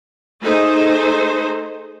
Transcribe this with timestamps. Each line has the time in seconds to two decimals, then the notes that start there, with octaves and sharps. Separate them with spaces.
0.42 A3 D#4 G#4 C5